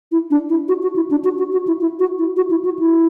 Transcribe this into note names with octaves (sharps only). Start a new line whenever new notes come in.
E4
D4
E4
F#4
F#4
E4
D4
F#4
F#4
F#4
E4
E4
F#4
E4
F#4
E4
F#4
E4